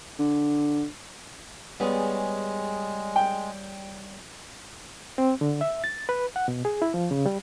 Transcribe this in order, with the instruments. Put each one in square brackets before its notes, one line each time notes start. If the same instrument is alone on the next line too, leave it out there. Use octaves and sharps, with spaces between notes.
[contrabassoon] D3
[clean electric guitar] G3 C#4 G#4 [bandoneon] G#3 [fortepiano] B3
[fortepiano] G5
[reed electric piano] C4
D3
E5
A6
B4
F#5
B2
G#4
E4
F3
C#3
G3